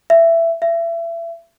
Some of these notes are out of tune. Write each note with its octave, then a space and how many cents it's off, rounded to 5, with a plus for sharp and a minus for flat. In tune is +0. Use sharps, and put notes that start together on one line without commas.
E5 +15
E5 +30